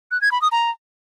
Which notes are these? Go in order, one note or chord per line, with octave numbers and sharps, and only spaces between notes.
F#6
G#6
B5
D#6
A#5